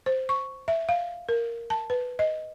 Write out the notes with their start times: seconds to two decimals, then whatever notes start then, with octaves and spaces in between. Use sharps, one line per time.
0.06 C5
0.29 C#6
0.68 E5
0.89 F5
1.29 A#4
1.70 A5
1.90 B4
2.19 D#5